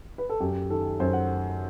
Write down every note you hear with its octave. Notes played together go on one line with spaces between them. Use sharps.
B4
A4
F#2 G4
D#3 A4
F#2 C5
F#5